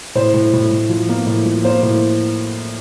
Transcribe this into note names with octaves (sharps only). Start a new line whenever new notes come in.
A2 C5
A2
A2
A2
F3
A#3
A2
F3
A#3 C5
A2